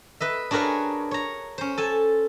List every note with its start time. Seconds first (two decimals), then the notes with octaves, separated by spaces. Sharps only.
0.20 B4 D#5 E5
0.51 D4 F#4 G#4 A#4 B4 C#5
1.11 C#5 A#5
1.58 C#4 C5
1.77 A4 G#5 A5